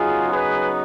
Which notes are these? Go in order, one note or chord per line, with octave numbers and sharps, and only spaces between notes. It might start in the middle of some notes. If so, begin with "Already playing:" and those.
Already playing: C#3 F#3 B3 D#4 F4 G#4
G#4 B4